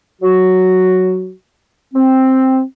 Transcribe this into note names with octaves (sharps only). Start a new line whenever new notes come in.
F#3 F#4
C4